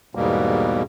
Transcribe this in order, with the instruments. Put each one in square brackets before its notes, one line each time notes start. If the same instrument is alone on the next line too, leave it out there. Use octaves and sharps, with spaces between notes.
[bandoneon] E2 G#2 B2 G3 A#3